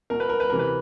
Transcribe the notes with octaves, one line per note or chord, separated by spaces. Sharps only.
B2 A#4
B4
A#4
B4
C3 E3 A#4
B4